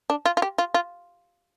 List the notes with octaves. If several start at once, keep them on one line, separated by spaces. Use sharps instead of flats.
D4
F4
F4
G4
F4
F4